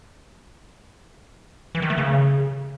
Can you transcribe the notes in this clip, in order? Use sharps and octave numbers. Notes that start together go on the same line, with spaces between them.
E3
D#3
A3
C#3